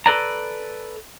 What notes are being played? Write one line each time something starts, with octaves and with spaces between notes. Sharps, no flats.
A4 B4 D5 A#5